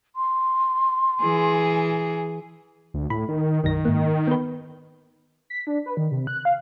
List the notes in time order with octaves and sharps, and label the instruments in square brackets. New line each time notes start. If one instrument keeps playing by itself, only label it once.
[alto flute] C6
[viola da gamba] E3 G#4
[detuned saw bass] D2
[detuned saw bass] A2 [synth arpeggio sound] B5
[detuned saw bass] D#3
[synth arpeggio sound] B1 F#2 A#6 [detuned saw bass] D#3
[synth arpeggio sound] G#2 A#3
B3 B4
[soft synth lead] B6
D4
B4
D#3
C3
F#6
F5